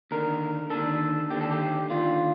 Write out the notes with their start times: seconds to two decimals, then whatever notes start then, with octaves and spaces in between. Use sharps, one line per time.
0.11 D#2 D3 A#4
0.70 D#2 D3 A4
1.30 D#2 D3 G4
1.41 A4
1.51 G4
1.90 D#2 D3 F4